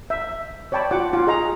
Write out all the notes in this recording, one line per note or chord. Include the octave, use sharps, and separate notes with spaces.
E5
C#5 D5 G5 A5 B5 D6
F4 F#4 F#5 D6
F4 D6
G#4 D#5 A#5